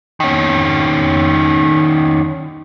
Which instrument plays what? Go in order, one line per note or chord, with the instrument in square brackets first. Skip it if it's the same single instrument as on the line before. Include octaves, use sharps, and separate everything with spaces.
[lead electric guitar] D#3 C#4